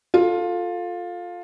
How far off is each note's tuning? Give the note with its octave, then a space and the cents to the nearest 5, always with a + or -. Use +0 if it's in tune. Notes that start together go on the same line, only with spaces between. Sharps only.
F4 +15 A4 +0